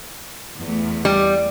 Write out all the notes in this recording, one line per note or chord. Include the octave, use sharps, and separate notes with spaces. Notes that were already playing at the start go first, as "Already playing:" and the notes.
E2 A3
G3